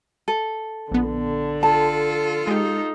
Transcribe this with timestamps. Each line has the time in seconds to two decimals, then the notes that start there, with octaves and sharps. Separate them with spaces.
0.28 A4
0.91 A#1 D3 B3
1.63 F4 A4 A5
2.47 G#3 D#4 G4